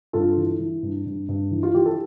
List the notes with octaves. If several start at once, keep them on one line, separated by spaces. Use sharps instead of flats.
G2 F4 A4
E3
E3
G2
G2
G2
E3
F4
E3 G4
A4